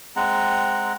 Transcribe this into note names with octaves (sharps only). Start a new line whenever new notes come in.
G#3 C4 F#5 A#5